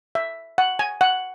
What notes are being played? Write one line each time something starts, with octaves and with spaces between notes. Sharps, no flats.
E5
F#5
G#5
F#5